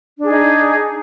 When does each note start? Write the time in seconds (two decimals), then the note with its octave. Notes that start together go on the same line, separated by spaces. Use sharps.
0.19 D4
0.24 G#4
0.28 D#4